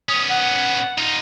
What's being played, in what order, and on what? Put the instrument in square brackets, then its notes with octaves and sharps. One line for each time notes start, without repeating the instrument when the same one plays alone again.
[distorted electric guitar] B3 C#4 [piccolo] D#6
[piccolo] F#5
[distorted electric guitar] D#4 F4